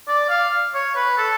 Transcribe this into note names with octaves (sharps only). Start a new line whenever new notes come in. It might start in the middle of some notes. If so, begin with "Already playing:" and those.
D5
F5
C#5
B4
A4